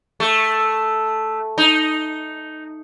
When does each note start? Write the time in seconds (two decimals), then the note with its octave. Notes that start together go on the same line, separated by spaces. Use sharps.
0.20 A3
1.58 D#4